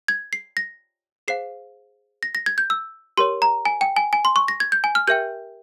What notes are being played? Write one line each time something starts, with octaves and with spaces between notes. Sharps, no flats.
G#6
C7
A#6
G#4 C5 F5 C7
A#6
A#6
G#6
G6
E6
G4 A#4 C#5 C6
A#5
G#5
G5
G#5
G#5
C6
C#6
A#6
G#6
G6
G#5
F6
G4 A#4 E5 G5 G6